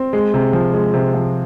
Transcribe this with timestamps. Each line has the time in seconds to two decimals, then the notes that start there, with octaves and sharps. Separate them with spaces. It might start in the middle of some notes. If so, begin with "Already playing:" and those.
Already playing: C4
0.13 G#3
0.34 C3
0.53 F3
0.74 G#3
0.94 C3
1.14 F3